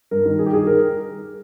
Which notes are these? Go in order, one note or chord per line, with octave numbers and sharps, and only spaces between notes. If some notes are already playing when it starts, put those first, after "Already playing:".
G2 A#4
D#3
G2 G#4
G4
D#3 G#4
A#4